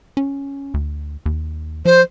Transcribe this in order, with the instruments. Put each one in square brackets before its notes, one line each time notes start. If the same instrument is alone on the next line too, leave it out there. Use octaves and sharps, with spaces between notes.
[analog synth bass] C#4
D2
D#2
[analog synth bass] F3 [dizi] C5